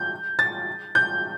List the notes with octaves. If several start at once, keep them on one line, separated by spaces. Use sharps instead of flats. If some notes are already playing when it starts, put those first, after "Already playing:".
Already playing: G6
A6
G6